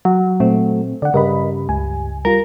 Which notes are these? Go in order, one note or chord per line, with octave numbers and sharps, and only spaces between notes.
F#3
A#2 A3 C4
D3 D5 F#5
G2 C#3 A#4 D#5 B5
C#2 G#5
G3 F4 A#4